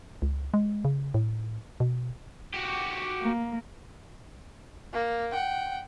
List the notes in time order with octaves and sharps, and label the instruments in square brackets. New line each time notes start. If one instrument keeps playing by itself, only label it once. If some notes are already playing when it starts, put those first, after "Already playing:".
[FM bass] C#2
G#3
C#3
A2
B2
[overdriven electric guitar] F#4 G4
[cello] A#3
[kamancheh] A#3
F#5 G5